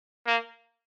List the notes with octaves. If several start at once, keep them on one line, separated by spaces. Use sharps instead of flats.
A#3